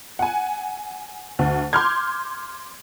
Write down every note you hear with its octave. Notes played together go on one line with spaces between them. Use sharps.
F#5 G#5
D2
C6 D6 F6 G6 G#6